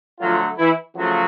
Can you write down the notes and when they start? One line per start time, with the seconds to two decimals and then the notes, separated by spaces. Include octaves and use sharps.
0.20 D3 F3 F#3 A3 F4
0.58 E3 E4
0.96 C#3 F3 F#3 A3 F#4